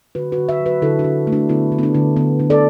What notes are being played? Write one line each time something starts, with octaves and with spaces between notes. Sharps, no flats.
D3 F#4 B4
F#4 B4
D3
B4 E5
F#3
F#4 B4
D3 E4 A4
D4 F#4
D3
A3
D4 F#4
D3 B3 E4
D3
B3
D4
D3
D3 B3
D3
A4 D5